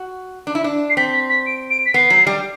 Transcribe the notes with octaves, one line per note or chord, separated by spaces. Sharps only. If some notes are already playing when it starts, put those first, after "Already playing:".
Already playing: F#4
D4
E4
D4
C7
C4 B6
B6
B6
D7
D7
B6
B3 C7
F#3
G3